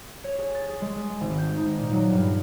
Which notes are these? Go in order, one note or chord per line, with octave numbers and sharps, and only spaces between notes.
C#5
G#4
A6
G#4
G#3
D#6
G#1
G6
D#4
A#2
F#3
G2